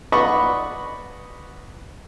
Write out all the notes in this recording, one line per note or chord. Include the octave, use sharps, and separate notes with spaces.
B4 D5 D#5 F#5 B5 C#6